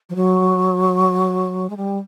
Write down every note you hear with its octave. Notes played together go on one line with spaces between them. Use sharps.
F3
F#3
G#3
G3